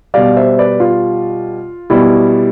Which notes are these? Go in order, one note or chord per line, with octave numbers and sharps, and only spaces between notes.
B2 G3 D5 F5
C5 E5
B4 D5
F4
B2 G3 E4